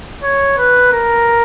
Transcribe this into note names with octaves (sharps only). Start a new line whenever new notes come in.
C#5
B4
A#4